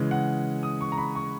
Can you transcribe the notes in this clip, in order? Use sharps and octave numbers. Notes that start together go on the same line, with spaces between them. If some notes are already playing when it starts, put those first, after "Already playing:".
Already playing: C#3 E3 G#3
F#5
D#6
C#6
A#5
B5
C#6